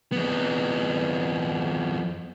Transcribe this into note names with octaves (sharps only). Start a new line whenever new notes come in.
F2 B3